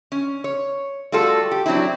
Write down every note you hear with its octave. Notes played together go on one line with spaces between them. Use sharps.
C#4
C#5
G3 A3 F4 F#4 A4
G4
F#3 C4 D4 E4